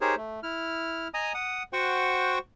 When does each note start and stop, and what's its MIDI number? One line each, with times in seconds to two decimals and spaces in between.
0.01 0.15 63
0.01 0.15 67
0.01 0.15 68
0.01 0.15 70
0.01 0.15 72
0.01 0.15 73
0.17 0.40 57
0.43 1.08 64
0.43 1.08 89
1.14 1.33 75
1.14 1.33 80
1.14 1.33 82
1.14 1.33 87
1.34 1.63 78
1.34 1.63 87
1.73 2.38 66
1.73 2.38 72
1.73 2.38 78
1.73 2.38 79
1.73 2.38 85